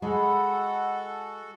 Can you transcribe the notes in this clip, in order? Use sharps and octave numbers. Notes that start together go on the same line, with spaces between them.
G#3 F#4 A4 D#5 F#5 G#5 B5